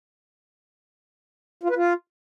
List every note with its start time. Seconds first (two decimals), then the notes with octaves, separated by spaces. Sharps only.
1.63 F4
1.70 B4
1.76 F4